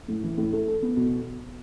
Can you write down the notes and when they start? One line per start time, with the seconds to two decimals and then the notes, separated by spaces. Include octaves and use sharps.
0.08 A2
0.24 E3
0.38 A2
0.53 A3
0.68 A4
0.82 B3
0.97 B2